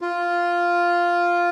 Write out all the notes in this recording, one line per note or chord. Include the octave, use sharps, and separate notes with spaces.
F4